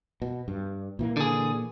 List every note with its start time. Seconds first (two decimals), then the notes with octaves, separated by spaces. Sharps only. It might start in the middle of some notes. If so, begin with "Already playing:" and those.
0.22 B2
0.48 G2
0.99 A#2 E3 A#3
1.17 D3 G#4